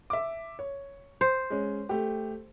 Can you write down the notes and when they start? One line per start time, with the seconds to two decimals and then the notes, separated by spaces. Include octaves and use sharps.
0.10 E5 D6
0.59 C#5
1.21 C5
1.50 G#3 C#4
1.89 A3 G4